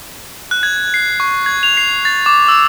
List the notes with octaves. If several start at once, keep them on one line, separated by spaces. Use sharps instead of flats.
F#6
G#6
C7
C#6
G#6
F7
C7
A6
D6
E6